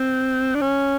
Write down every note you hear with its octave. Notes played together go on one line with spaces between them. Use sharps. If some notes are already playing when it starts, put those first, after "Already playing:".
Already playing: C4
D4
C#4